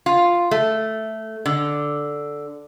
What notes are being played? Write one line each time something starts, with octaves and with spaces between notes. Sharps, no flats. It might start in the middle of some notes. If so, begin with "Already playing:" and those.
F4
A3
D3